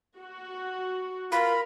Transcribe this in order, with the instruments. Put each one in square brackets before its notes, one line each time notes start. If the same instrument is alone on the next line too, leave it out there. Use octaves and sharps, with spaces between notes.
[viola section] F#4
[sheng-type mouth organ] F4 [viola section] A#4 [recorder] B5